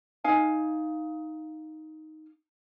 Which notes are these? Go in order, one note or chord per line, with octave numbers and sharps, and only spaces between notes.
D#4 F5 G#5